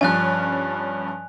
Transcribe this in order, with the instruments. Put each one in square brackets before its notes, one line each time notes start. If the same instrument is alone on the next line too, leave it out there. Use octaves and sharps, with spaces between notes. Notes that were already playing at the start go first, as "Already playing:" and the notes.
[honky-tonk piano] G2 F3 C#4 [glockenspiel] G#5 F#6